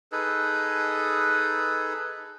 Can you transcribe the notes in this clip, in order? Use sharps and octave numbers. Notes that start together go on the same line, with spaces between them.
D#4 G#4 A4 B4